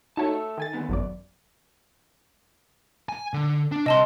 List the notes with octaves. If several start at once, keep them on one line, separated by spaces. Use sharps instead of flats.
D#4 F#4 A4 C#5 E5 A5
E6
D#3 G#5 A6
D2 B3
G#1 F#2 D5
G#5
D3
D4
C3 D#5 A5 C6